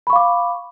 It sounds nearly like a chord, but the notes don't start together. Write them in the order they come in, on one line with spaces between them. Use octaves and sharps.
B5 C#6 F5 D6